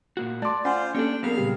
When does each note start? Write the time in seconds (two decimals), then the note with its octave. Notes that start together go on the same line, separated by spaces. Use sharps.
0.17 A#2 A#3 F#4
0.42 A3 D5 A5 C6 D6
0.65 C#4 F4 C5 F#5 G#5
0.95 A#3 C#4 D4 G4 A4 G5
1.23 F#3 B3 C4 G#4 A#4 F5 F6
1.37 A#2 C#3 G3 G4